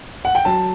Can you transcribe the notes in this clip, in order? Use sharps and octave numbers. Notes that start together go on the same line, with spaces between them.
F#5
G5
F#3 A5